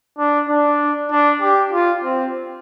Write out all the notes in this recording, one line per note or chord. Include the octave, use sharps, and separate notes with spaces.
D4
D4
D4
G4
F4
C4